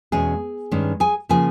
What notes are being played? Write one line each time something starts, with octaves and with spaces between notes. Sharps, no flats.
E2 B2 G#3 C#4 G#4 G#5
G2 D#3 G#3 C#4
G#4 G#5
C#3 F3 A#3 G#4 G#5